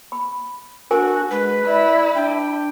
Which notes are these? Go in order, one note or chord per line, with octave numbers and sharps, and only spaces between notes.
B5
D4 F#4 A#4 G#5
G#3 B4
E4 D5
D4 G5